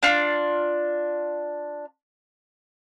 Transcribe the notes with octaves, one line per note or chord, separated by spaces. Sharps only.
D4 F4